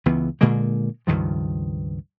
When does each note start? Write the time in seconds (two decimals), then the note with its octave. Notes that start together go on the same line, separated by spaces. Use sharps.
0.06 C#2 E3 B3
0.41 A#2 D3 G#3 A#3
1.07 C#2 G2 D#3 F3